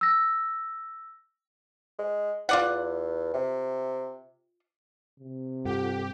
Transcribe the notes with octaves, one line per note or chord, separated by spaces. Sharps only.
E6 A#6
G#3
E2 F4 D5 F#5
C3
C3
G2 F4 G4 A4 F#5